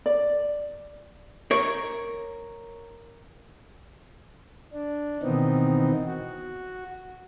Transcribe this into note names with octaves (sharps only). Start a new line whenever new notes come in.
D5
A#4 C#5
D4
B2 D#3 E3 B3 C4 D#4
F#4